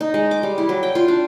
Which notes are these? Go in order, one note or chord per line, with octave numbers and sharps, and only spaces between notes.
D#4
G#3
D6
G3
E4
F#3
G5
F4
D4